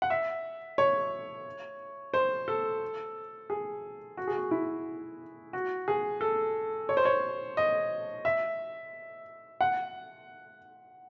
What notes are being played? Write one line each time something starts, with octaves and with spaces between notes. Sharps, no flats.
F#5
E5
C#5
C5
A4
G#4
F#4
G#4
F#4
E4
F#4
G#4
A4
C#5
C5
C#5
D#5
E5
F#5